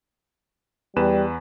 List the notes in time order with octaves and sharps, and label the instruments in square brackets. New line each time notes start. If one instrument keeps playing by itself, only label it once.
[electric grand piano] E2 B4 E7 [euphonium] G3